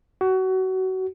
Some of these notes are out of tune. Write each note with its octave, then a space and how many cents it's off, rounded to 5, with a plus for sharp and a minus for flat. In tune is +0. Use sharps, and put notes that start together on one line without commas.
F#4 +25